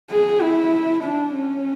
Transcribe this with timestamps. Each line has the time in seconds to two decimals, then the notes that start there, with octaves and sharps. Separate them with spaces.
0.10 G#4
0.42 E4
1.04 D4
1.34 C#4